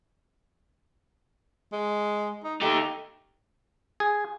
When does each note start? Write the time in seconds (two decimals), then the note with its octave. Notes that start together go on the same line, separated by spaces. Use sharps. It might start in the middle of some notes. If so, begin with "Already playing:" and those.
1.73 G#3
2.44 D#4
2.61 A3 D#4 G4
4.00 G#4